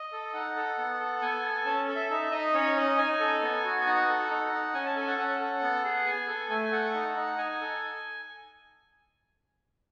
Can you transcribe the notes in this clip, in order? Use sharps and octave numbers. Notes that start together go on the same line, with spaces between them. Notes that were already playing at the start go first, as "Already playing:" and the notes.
Already playing: D#5
A4
D#4 F#5
A4
B3
A4
B3 G#5
A4
C#4 A5
A4
E5
D#4 E5
D#4 D#5
C#4 C#5
C#4 D#5
D#4 G#5
A4
B3
F#4
D#4 F#5
A4
D#4
D#4
C#4 G#5
A5
A4 G#5
F#5
C#4 F#5
A4
B3
G#4
B3 G#5
A4
A3 G#5
A4 F#5
D#4
D#4
D#4 G#5
A4